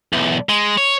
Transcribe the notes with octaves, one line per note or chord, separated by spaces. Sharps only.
B1 E2
G#3
C#5